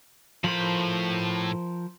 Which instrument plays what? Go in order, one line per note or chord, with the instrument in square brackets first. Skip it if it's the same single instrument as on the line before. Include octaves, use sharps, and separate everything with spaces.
[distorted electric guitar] A2 B5 [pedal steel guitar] F3 A#4 C5